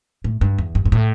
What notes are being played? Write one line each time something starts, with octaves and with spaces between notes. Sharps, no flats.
A2
G2
E2
G2
G2
A2